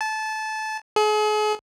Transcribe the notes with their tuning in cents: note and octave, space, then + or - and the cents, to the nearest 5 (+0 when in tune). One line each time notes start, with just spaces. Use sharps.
A5 -20
G#4 +40